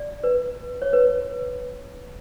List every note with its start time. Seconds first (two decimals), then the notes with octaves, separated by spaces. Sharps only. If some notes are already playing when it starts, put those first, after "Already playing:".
Already playing: D5
0.24 B4
0.82 C#5
0.93 B4